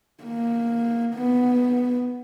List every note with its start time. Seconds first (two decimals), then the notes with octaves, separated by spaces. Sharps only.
0.24 A#3
1.14 B3